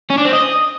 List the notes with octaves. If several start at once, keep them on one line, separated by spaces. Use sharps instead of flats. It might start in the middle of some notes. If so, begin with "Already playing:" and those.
C#4
D4
C4
D#5